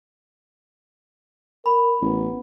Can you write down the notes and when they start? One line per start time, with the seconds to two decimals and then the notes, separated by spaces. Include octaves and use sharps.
1.66 A#4 B5
2.02 A1 B3